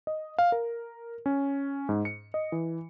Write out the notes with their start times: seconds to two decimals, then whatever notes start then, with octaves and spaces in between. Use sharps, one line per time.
0.07 D#5
0.38 F5
0.52 A#4
1.26 C#4
1.89 G#2
2.05 C#7
2.34 D#5
2.52 E3